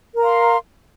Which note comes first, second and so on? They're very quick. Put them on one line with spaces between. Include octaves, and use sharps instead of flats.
A#4 A#5 F5 C6